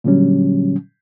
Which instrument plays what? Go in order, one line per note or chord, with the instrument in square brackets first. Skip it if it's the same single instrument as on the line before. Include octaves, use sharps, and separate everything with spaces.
[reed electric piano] A#2 D3 F#3 G3 C#4